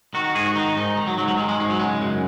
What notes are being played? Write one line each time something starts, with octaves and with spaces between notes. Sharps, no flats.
D#3 F#4
F#4
G#2 G#4
F#4
D#3 D#4
G#2 D#4
D#3
F#3
G#2 F#3
F#3
D#3 G#3
G#3
G#2 G#3
F#3
C#3 G#3
F#2